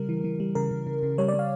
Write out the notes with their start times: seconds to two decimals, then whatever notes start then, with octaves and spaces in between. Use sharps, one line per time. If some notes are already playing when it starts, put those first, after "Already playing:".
Already playing: C#3 G3 A#4
0.09 E3
0.24 E3
0.40 G3
0.55 C#3 A#4
0.71 C#3
0.87 C#3
1.03 C#3
1.18 G3 C#5
1.28 D5
1.34 G3
1.39 F5